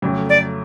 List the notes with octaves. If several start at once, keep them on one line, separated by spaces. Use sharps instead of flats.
F2 C#3 F#3 A3 C#4
D5